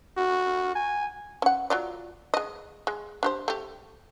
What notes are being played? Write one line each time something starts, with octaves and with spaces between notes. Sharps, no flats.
F#4
G#5
C#4 F#5
F#3 F4 D5
G#3 D#5
G#3
D4 G4 C5
A3 G4